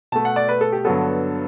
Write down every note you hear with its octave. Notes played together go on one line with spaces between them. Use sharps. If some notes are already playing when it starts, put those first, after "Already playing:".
B2 A3 A5
F#5
D5
B4
A4
G4
G2 D3 F#3 B3 A4